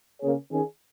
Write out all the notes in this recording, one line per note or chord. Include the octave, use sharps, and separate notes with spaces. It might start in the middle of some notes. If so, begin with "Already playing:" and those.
C#3 A#3 C#4 G#4 C#5
D#3 C#4 G#4